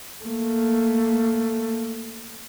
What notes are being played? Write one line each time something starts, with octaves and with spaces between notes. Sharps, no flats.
A3 A#3